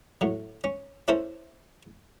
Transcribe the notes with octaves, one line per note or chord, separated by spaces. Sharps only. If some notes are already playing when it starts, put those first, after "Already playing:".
A2 F#3
C#4
C#4 E4 A4 A#4 C5